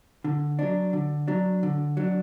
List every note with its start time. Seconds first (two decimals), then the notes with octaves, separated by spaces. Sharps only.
0.24 D3
0.59 F#3 D4
0.93 D3
1.28 F#3 D4
1.63 D3
1.97 F#3 D4